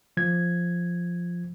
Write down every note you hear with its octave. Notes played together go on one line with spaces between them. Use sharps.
F3 G#6